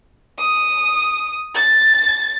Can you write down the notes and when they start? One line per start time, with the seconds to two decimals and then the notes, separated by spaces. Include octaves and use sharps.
0.39 D#6
1.55 A6